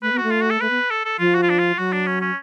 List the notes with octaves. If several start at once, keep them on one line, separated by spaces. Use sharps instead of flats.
A3 B4
B3
F#4
A3
F4
F#4
A4
A3 B4
B3
A4
A4
F3 F4
F#4
F4
D4
F4
F#3 F#4
D4
C#4
C#4